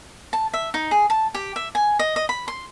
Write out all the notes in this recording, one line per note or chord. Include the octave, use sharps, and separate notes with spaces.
A5
E5
D#4
G#4
A5
G4
E5
G#5
D#5
D#5
B5
C6